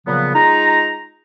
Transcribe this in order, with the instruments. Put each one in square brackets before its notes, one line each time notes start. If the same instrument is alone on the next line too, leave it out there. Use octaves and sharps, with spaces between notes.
[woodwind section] A#2 C#3 F3 F#3 B3
G#3 D#4 F4 A#5